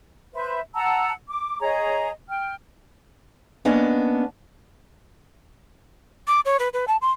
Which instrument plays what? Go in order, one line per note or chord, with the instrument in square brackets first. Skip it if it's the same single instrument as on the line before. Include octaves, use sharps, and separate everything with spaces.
[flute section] B4 C5 E5
F#5 A5 A#5 E6
D6
G#4 C#5 D#5 A#5
G5 F6
[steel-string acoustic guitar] A#3 B3 C#4 D4 D#5 A5
[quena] D6
C#5
B4
B4
A5
C6